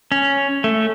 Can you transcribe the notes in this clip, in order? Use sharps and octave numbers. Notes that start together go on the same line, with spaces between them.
C#4
A3